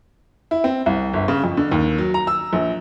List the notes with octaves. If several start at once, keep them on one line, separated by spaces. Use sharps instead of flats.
E4
C4
C2
G1
C#3
F2
D3
D#2
F#3
A#5
E6
A#1